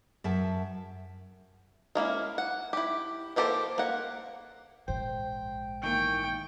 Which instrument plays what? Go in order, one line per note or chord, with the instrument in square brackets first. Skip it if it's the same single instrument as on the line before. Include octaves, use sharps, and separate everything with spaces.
[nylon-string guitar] F#2 E5 A5
[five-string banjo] G#3 A#3 C#4 E4
F#5
E4 G4
E3 A#3 G4 A4 C5
A#3 F#5
[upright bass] A#1 G#2 [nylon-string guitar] C5 [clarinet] G5
[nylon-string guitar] D#3 E3 A#3 [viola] G5 [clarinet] C#6